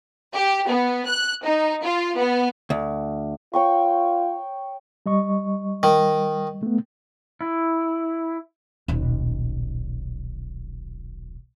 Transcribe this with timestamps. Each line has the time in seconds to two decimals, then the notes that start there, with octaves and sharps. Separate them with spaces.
0.35 G4
0.69 B3
1.08 F#6
1.45 D#4
1.84 F4
2.17 B3
2.70 D2
3.53 F4 C#5 G5 C#6
5.06 G3 D#5 C#6
5.83 D#3
6.63 A3 B3
7.41 E4
8.88 D#1 B1